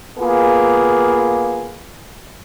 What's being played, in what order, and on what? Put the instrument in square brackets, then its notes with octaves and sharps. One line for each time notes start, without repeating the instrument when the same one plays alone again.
[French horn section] A#3 B3 F4 G#4